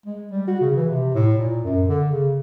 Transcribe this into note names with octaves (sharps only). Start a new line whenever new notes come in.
G#3
G3
F#4
C#3
E3
C3
A2
A#2
F#2
D3
C#3